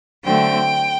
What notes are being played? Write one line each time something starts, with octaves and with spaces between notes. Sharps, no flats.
D3 F#3 A3 C4 G5